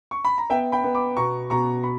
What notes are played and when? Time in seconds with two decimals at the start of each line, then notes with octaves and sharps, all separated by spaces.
0.11 C#6
0.25 B5
0.38 A#5
0.50 B3 E5 G5
0.72 G5 B5
0.84 B3
0.94 B5 D6
1.17 B2 A#5 C#6
1.50 B2 A#5 C#6
1.83 B5